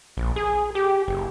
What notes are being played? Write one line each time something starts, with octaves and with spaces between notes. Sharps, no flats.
A#1
G#4
G4
F#1